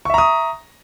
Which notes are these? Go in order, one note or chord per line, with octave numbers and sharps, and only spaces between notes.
E5 A#5 C#6 D#6